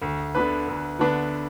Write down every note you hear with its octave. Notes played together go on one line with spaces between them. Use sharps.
D2
D3 B3 D4 B4
D2
D3 B3 D4 B4